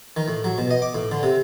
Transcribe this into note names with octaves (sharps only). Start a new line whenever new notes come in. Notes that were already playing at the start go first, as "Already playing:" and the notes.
D#3
A2
F#3
B2
D#5
D6
A2
D3
C3